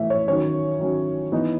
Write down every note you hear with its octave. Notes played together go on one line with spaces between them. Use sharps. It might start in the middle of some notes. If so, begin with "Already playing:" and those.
Already playing: A2 E3 A3 E5
C#5
D#3 F#3 C#4 C#5
D#3 F#3 C#4
E3 B3 D#4